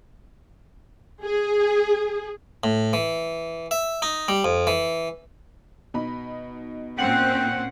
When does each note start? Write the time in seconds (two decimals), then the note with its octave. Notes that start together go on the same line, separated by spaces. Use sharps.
1.23 G#4
2.64 A2
2.93 E3
3.71 E5
4.02 D#4
4.28 G3
4.44 F2
4.67 E3
5.94 B2 D#4 B5
6.98 A#2 C4 C#4 F#5 G5